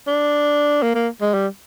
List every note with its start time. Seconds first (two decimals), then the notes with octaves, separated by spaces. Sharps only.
0.07 D4
0.83 A#3
0.95 A#3
1.21 G#3
1.34 G3